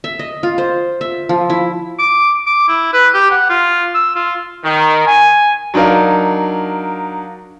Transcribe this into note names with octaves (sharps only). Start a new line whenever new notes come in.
E5
D#5
F4
C5
E5
F3
E4
D6
D6
E4
B4
G4
F#5
F4
E6
F4
D#3
G#5
F#3 D4 D#4 A#4 F5